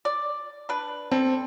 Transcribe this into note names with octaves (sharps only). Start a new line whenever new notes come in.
D5
D4 B4
C4 D4 A4